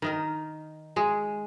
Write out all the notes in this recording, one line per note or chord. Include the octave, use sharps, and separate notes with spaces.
D#3 D#4 A#4
G#3 G#4